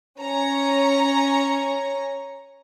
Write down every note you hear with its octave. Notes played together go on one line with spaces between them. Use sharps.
C#4 C#5 A#5